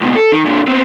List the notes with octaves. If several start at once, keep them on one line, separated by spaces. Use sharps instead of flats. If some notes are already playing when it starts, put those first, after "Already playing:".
C#2 B2
A4
D#3
A#2 D3
B3 C4